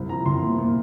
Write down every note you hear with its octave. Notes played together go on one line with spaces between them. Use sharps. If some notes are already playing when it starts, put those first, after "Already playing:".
Already playing: C2
F3 A#5
C2 C6
A#2
A#2